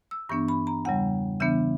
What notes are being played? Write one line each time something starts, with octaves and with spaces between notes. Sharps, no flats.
E6
G2 E3 B3 D4 C#6
B5
A#5
E2 C#3 G3 F#5
C#3 E3 B3 D4 E5